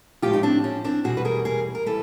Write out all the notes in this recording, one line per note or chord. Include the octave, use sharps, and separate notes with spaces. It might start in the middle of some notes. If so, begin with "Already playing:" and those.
A2 F3 G#3 F4 G4
D#4
C4 D4
C#4
C4 D4
E2 B2 G3 F#4 G#4
B4
G#4 A#4
G#4 A#4
A#4
E3 G3 A4 B4